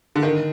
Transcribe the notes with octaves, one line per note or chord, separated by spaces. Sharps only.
D3
D#3